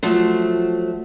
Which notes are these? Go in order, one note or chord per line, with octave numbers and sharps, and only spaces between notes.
F3 F#3 A3